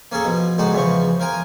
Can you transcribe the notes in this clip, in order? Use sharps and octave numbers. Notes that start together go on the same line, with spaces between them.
A#3 C#4 G#4 A4
B2 F3
C#2 A2 G#3 D#4 F#4
E2 C#3 F3 C#6
F3 A#4 G#5